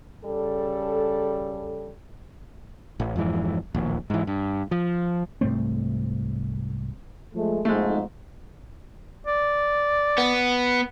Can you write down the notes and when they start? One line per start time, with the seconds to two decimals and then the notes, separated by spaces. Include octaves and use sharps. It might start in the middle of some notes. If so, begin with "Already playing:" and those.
0.24 C#3 G3 A4
3.00 A1
3.16 F2 G#2 E3
3.75 D1 A#1 D#2
4.10 G#2 E3
4.27 G2
4.71 F3
5.41 C2 G#2 A3 C4
7.35 F3 G#3 A3
7.65 B1 F2 G#2 G#3 A3
9.27 D5
10.18 B3